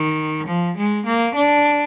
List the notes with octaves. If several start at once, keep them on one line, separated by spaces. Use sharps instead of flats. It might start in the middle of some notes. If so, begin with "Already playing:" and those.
Already playing: D#3
F3
G#3
A#3
D4